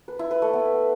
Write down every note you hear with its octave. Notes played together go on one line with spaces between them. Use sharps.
B4
E4
B4
A3
B3